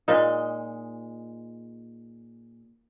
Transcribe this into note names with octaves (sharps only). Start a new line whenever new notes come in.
A#2 G#3 D#4